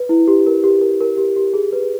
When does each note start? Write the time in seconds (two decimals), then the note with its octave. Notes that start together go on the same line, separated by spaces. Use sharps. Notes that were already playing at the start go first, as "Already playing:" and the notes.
Already playing: B4
0.09 E4
0.27 G4
0.46 A#4
0.64 G4
0.81 A#4
1.00 A#4
1.17 G4
1.36 G4
1.54 G#4
1.73 B4